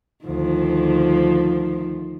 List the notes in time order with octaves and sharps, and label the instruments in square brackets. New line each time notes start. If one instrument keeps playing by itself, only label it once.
[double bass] D2 [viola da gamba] D#3 F3